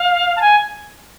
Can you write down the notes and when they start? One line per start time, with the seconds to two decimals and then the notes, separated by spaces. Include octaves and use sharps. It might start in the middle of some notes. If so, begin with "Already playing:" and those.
Already playing: F5
0.36 A5
0.41 G#5